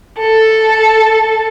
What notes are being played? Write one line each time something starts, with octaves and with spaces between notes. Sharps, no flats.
A4